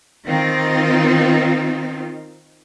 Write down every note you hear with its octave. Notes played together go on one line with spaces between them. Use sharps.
D#3 C4 D#4 F4